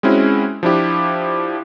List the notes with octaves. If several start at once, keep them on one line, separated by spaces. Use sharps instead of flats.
G#3 C4 C#4 E4 F#4
F3 D4 E4 G4